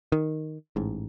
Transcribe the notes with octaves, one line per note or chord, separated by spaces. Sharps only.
D#3
A1 G#2